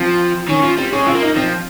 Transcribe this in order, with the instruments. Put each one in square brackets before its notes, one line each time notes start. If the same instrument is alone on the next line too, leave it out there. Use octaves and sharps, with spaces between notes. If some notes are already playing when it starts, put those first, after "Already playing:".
Already playing: [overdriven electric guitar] F3 [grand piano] C4
[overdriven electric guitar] D#3 [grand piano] C#4
[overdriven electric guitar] F3
[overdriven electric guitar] G3 [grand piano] C4
[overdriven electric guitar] G#3 [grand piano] C#4
[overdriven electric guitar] C4 [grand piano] F4
[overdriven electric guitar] A#3
[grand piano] D#4
[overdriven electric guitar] F3 [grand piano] C4